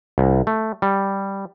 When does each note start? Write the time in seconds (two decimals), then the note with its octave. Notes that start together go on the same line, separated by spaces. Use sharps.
0.18 C2
0.47 A3
0.82 G3